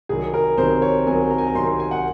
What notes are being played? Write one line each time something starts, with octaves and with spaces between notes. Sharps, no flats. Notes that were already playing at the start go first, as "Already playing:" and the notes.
C2 C3 D#3 F#3 G#4
A#4
C2 C3 D#3 F#3 C5
C#5
C2 C3 D#3 F#3 G#5
A#5
G#5
A#5
C2 C3 D#3 F#3 C6
C6
G#5
F#5